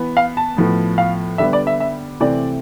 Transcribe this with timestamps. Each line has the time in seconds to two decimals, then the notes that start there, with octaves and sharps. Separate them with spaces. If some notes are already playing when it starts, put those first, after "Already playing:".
Already playing: E3 B3
0.17 F5
0.37 A5
0.57 A2 F3 B3
0.98 F5
1.38 D3 G3 B3 E5
1.53 D5
1.67 E5
1.80 E5
2.20 C3 E3 A3 C4 D5